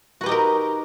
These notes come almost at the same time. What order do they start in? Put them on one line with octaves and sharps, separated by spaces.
F#4 B4 G4 D#4 A#4